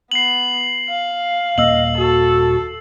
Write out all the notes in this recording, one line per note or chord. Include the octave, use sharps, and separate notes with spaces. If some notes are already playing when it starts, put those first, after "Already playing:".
B3 C7 F#7
F5
D#1 A#3 D#5 E6 F#7
F#4 A4